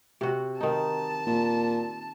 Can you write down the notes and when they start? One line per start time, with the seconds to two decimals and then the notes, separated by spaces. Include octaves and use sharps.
0.21 C3 F#4
0.61 D#3 D#4 A5
1.27 A#2